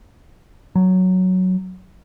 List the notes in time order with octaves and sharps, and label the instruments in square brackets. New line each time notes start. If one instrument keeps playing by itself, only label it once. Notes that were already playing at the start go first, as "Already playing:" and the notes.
[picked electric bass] F#3